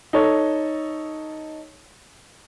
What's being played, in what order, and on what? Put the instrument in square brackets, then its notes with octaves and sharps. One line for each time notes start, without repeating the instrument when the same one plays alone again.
[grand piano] D#4 A4 C#5